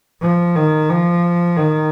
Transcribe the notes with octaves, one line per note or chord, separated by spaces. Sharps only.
F3
D#3
F3
D#3